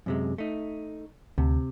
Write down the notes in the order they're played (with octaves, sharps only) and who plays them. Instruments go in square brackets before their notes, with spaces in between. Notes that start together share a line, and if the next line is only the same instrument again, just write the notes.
[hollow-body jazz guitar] F#2 C3 G#3
A3 D#4
[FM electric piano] D2 [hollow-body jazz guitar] C3